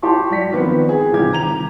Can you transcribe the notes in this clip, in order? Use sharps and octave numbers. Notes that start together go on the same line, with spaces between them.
G4 A5 C6 C#6
F#3 D5 B6 C#7
D#3 F3 B3 C4 B4
G#4
D2 C3 D#3 G3 G4 G#6
D#3 A#5 F7